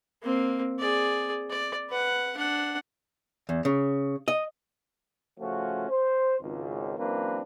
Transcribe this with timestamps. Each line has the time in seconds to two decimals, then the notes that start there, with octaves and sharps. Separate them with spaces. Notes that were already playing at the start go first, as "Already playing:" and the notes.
0.23 A#3 C4
0.79 G#4 D5
1.49 D5
1.90 B4 F#5
2.37 D4 F#5
3.49 E2
3.65 C#3
4.28 D#5
5.38 C#3 F3 A3 C#4 F4 F#4
5.89 C5
6.40 G#1 C#2
6.97 F#2 E3 A#3 C4 D4 B4